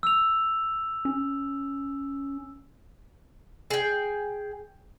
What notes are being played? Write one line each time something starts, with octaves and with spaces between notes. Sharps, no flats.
E6 F7
C#4
G#4 G5